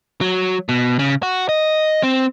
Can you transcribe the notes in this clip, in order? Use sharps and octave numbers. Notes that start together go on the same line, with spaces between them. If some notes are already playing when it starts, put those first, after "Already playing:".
F#3
B2
C#3
F#4
D#5
C4